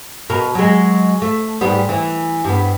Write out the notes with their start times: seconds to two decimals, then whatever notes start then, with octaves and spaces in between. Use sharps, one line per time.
0.30 B2 A#4
0.55 F#3 G#3
1.22 A3
1.61 G#2 G3 B3
1.89 E3
2.44 G2 B3